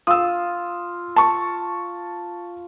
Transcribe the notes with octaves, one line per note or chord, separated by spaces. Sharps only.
F4 D#6 E6
A5 C#6